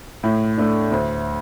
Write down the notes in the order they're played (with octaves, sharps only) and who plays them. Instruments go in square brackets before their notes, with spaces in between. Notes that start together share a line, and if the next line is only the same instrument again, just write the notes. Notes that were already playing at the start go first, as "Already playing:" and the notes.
[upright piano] A2
A3 D4
D2